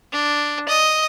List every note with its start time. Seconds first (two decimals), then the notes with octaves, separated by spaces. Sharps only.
0.12 D4
0.68 D#5